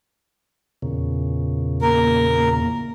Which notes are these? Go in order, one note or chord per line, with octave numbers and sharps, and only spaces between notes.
E2 A#2 C#3
A#3 A#4